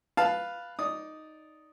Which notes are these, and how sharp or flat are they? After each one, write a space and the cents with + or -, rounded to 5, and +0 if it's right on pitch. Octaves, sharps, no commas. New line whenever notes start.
B4 +0 F5 +0 A5 +0
D#4 +0 D5 -10 D#6 +0